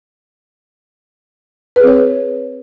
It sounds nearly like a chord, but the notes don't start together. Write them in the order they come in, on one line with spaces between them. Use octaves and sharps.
B4 G#4 C4 C#5